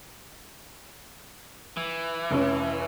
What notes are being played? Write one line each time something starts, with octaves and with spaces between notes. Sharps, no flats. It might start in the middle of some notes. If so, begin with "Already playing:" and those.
E3
F1 C#4